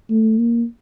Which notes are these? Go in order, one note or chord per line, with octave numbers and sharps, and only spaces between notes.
A3
A#3